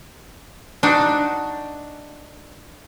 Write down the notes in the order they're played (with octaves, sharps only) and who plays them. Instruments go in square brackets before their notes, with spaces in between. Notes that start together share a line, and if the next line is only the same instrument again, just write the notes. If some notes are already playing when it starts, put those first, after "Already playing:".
[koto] D4 D#4 F#4